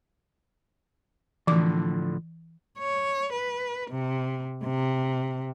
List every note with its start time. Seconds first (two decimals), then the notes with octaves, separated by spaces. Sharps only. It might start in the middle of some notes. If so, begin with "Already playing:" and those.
1.47 A2 D3 E3 F3 D6
2.78 C#5
3.33 B4
3.91 C3
4.64 C3